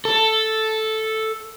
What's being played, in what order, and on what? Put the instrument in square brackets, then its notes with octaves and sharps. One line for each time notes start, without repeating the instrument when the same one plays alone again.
[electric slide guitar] A4